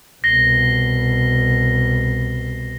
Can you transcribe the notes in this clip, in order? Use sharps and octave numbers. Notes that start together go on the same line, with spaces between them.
C2 B2 A#6 C7 G7